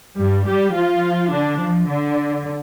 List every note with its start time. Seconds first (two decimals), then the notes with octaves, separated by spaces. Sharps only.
0.19 G2 G3
0.47 G3 G4
0.75 F3 F4
1.31 D3 D4
1.59 F3
1.87 D3